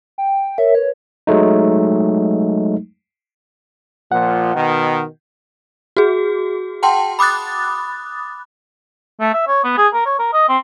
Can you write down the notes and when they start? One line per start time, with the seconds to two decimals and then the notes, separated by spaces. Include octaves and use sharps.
0.18 G5
0.58 A#4 C#5 E5
0.75 B4 C#5
1.27 F#3 G#3 A3 D#4
4.12 A#2 F3 F#5
4.55 B2 D#3
5.97 F#4 G#4
6.83 F#5 G5 A5 C6
7.19 B5 D6 D#6 F#6 A6
9.20 A3
9.34 E5
9.47 C#5
9.64 B3
9.78 G#4
9.94 A#4
10.05 C#5
10.19 A#4
10.33 D#5
10.48 C4